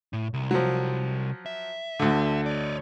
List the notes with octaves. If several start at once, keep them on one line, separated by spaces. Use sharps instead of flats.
A2
C2
F3 F#3
E5
D2 D3
C#5 D5